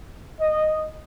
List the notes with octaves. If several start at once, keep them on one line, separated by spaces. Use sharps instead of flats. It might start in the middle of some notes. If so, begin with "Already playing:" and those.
D#5